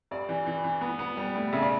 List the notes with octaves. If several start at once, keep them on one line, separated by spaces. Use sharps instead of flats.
G2 D5
E3
E3
E3
B3
B3
G3
A2
C#3 E5
D5